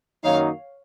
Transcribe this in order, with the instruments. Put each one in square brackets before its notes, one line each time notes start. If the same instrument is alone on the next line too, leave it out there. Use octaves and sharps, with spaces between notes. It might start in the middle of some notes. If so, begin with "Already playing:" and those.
[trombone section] F#2 D#3 F#3 A#3 D#4 [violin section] C#5 F5